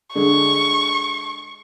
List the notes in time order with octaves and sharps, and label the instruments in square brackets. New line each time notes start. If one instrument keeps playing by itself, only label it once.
[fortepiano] D3 G#3 [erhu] C#6